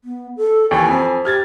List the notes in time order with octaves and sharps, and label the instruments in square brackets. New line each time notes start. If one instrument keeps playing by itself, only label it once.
[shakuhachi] B3
A4
[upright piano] D#2 E3 [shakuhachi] G#5
[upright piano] F2
[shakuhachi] G4 [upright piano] F6 G#6 A6